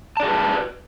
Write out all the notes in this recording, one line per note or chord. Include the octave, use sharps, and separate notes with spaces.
F#4 G#4 B4 D5 A5